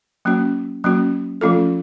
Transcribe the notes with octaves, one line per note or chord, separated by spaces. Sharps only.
F#3 A#3 C#4 F#4
F#3 A#3 C#4 F#4
F3 A3 C#4 F4 A4